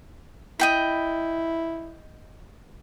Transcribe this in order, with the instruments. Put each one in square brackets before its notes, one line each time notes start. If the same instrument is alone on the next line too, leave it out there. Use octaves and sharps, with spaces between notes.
[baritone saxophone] E4 [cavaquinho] D#5 G5 B5